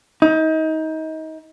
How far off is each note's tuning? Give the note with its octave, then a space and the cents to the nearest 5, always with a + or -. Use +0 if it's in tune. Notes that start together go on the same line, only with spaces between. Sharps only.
D#4 +30